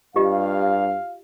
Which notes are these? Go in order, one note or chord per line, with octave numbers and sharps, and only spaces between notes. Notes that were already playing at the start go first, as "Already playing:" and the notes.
G2 F4 G4 D#5 F5